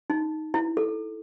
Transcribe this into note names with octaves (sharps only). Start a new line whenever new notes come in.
D#4
E4
A4